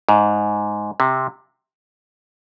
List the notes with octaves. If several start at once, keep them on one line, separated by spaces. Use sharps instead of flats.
G#2
C3